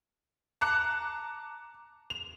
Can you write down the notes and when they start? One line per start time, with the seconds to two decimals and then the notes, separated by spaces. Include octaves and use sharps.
0.61 A5 A#5 D6 F#6 C#7
2.10 F7